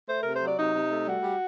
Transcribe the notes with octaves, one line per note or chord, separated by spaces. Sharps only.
A3 C5
C3 A#4
C5
F#3 D5
C3 D#4
C3
A3
G3 F#4
G3